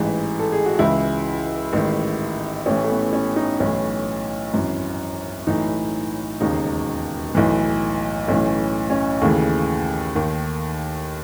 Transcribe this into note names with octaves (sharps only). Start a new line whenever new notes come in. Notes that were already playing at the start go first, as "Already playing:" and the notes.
Already playing: A1 G#2 E3
A4
G#4
F#4
C#2 C#3 E3 E4
A1 G#2 D#3
A1 A2 E3 C#4
A3
B3
C#4
D#4
B1 A2 E3 C#4
G#1 F#2 E3
B1 A2 E3 D#4
E1 D#2 C#3 D#4
B1 A2 E3
B1 A2 E3 C#4
C#4
D#2 C#3 E3 A3
D#2 D#3